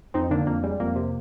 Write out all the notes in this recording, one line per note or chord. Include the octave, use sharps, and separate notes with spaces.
F2 C4 D#4
D3 A#3 D4
F2 A#3
G3 G#3
F2 A#3
C3